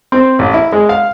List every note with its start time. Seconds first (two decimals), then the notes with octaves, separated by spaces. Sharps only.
0.12 C4
0.39 A1
0.54 E4
0.72 G#3
0.89 F5